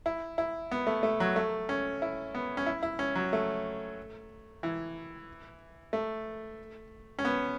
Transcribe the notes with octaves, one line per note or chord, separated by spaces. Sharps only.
E4
E4
B3
A3
A3
F#3
A3
C#4
E4
B3
C#4
E4
E4
C#4
F#3
A3
E3
A3
C#4
B3